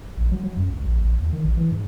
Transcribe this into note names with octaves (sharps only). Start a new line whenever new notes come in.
A#1
F#3
F#3
F#2
C#2
A#1
A#1
D#2
D#3
A#1
E3
G#2